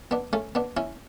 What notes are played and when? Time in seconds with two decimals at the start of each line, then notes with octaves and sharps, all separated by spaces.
0.11 B3 D4
0.33 A3 C#4
0.55 B3 D4
0.77 C#4 E4